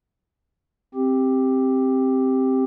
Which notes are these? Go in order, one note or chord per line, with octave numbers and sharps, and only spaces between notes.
C4 G4